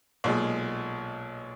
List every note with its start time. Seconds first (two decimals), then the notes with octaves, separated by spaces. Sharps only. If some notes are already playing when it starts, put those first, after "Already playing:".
0.24 B1 A#2 G#3